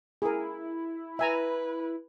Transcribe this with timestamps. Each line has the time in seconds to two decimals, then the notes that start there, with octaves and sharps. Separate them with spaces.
0.22 E4 G#4 A#4
1.19 B4 E5 G#5 A#5